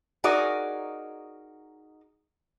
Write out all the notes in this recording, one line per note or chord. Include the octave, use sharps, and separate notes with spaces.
D#4 F#4 G#4 A#4 D5 D#5